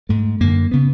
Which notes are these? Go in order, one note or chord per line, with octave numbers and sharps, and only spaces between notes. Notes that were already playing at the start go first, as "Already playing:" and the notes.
G#2 A3
F#2 D3 A#3
C#3 B3